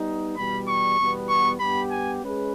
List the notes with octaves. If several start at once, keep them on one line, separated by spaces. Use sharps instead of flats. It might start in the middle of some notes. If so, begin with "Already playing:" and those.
Already playing: G3 B3 D#4
E2 B2 G3 B5
C#6
E2 B2 G3 B3
C#6
G2 G3 B3 G4 B5
G#5
G#3 C#4 G#4 B4